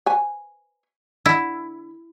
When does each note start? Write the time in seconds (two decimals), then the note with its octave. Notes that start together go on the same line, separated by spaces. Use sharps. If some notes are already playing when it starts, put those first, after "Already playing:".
0.06 B4 C5 G#5
1.26 D3 E4